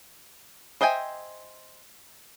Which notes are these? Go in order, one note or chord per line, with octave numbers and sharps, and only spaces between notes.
C5 D#5 E5 G5 G#5